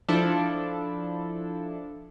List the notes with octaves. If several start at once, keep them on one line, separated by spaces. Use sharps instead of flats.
F3 D4 E4 A4